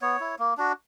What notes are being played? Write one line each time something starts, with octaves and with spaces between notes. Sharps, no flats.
B3 C#5
E4
A#3
D4 F#4